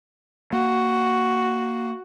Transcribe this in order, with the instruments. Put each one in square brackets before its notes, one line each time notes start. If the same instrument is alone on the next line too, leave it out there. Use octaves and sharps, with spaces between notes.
[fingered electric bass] A#3 [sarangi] F#4